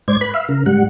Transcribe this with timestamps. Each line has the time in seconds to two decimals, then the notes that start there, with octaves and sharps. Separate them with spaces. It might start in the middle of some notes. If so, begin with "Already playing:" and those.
0.08 G#2 C5 D5 G#6
0.21 B4 B5
0.34 E5 F5
0.49 C#3 A#4
0.66 G#2 G3 F#5